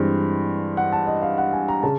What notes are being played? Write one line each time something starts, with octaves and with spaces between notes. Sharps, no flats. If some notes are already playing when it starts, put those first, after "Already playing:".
Already playing: G2 E3 G#3 C4
F#5
A5
D#5
F5
F#5
G#5
A#5
C#3 A5